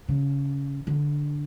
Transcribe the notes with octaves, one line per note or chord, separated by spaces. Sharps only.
C#3
D3